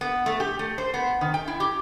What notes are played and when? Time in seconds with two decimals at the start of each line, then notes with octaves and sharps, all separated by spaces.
0.01 B3
0.26 A3
0.40 G4
0.59 A3
0.78 C5
0.94 B3
1.21 D#3
1.34 G5
1.48 E4
1.60 G4